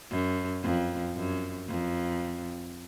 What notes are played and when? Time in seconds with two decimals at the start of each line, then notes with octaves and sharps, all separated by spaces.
0.10 F#2
0.63 F2
1.16 F#2
1.69 F2